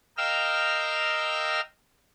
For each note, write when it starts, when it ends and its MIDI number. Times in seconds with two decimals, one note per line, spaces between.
0.17 1.61 70
0.17 1.61 75
0.17 1.61 77
0.17 1.61 79
0.17 1.61 88
0.17 1.61 89